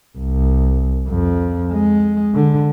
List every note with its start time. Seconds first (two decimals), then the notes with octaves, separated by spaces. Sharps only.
0.17 C2
1.08 F2
1.72 G#3
2.34 D3